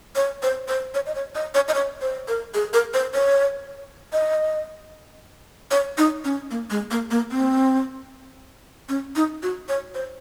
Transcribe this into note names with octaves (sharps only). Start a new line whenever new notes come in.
C#5
C5
C5
C#5
D#5
C#5
D#5
C#5
D#5
C#5
C5
A#4
G#4
A#4
C5
C#5
D#5
C#5
D#4
C#4
A#3
G#3
A#3
A#3
C4
C#4
D#4
F#4
C#5
C5